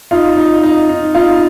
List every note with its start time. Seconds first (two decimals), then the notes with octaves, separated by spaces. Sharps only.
0.11 D#4 F4
0.37 D#4
0.63 D#4
0.89 D#4
1.15 D#4 F4